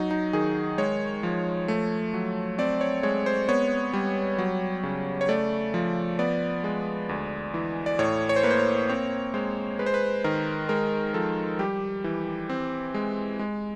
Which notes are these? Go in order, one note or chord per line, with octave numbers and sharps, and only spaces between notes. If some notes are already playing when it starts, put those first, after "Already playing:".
Already playing: F#3 D#4
D#4
D#3 G#4
G#3 C#5
F3
A3
F#3
C4 D5
C#5
G#3 C#5
C5
B3 C#5
G3
F#3
C#3
C#5
A3 D5
F3
B3 D5
G#3
D2
E3
D5
A2 C#5
C#5
C5
A#3 B4
C5
C#5
C4 C#5
G#3 C5
G#3 B4
C5
B4
D#3 A#4
G#3 A#4
F3 A4
G3 G4
E3
C4
G#3
G#3